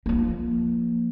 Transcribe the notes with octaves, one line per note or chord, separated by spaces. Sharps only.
F3 A#3